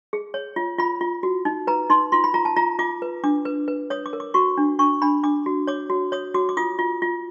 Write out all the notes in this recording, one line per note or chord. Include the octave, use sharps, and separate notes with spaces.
G#4
C#5
F4
F4 B5
F4
F#4
D#4
B4 A#5
D#4 C6
F4 C6
B5
F4 A#5
A5
F4 A#5
F4 D6
B4
D4 D6
B4
B4
C#5 D#6
D6
A#4
D6
F#4 C#6
D4
D4 C#6
D4 B5
D4 D6
F#4
C#5 D6
F#4
C#5 D#6
F#4 D6
D6
F4 D#6
F4
F4